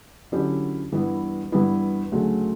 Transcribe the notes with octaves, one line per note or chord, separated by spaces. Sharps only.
D3 F#3 C#4 E4 G4
G2 E3 G3 B3 E4
G2 E3 G3 B3 E4
D2 C#3 F#3 A3